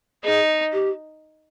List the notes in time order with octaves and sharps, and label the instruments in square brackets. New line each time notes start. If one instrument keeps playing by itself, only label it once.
[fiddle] D#4 [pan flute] G#4
[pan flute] G4